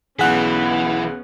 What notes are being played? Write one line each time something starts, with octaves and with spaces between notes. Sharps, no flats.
B1 E3 B3 C#4 G#4 F#5 F#6 B6